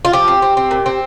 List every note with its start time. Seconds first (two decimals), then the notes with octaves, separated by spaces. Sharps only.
0.05 F4
0.13 F3 G4
0.28 C4
0.42 C4
0.57 C4
0.71 A#2
0.86 C4